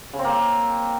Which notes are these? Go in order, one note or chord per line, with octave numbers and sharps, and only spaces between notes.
C#3
C4
A#3